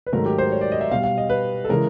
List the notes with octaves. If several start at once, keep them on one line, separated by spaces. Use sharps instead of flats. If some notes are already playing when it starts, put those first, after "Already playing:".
B4
G#2 D#3 F#3 A3 A#4
G4
C5
C#5
D5
D#5
E5
B2 G3 F5
F5
D#5
B4
A4
C#3 E3 G#3 A#4